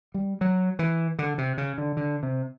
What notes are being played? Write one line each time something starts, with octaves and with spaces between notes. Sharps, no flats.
G3
F#3
E3
D3
C3
C#3
D3
D3
C3